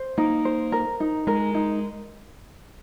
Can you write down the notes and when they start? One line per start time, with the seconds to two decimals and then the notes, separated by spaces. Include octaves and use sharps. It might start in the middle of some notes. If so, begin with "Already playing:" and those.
Already playing: C5
0.18 A#3 D#4
0.45 C5
0.72 A#4
1.00 D#4
1.27 G#3 A#4
1.54 D#4